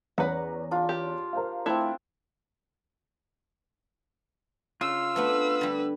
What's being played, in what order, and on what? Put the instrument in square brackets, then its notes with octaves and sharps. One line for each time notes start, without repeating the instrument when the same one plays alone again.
[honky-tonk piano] E2 C#4 A#5 [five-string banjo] B4 F#5
[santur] D4 F4
[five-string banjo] G4
[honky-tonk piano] A#4 C5 F5
[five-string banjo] A3 E4 [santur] C4 D4
[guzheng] C#3 [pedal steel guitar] F4 [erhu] E6
[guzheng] A3 B3 D4 [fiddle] B4
[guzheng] D3 G3